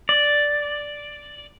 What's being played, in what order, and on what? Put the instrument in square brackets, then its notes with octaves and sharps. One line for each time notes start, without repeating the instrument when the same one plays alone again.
[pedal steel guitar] D5